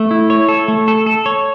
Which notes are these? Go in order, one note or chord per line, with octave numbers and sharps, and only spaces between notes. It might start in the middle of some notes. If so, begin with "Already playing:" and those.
Already playing: A3
E4
C#5
A4
A3
A4
A4
C#5